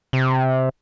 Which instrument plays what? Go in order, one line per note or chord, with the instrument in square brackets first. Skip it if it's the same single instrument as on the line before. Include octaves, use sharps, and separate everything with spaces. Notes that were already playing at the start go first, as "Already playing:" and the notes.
[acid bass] C3